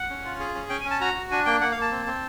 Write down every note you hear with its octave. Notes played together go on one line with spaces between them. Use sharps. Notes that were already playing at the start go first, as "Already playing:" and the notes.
Already playing: F#5
C#4
F4
G#4
C#4
C#4 G5
G#5
C#4
A5
F#4 A#5
F#4
D4 G#5
A#3 G5
A#3 F#5
F5
A#3 A5
C4
C4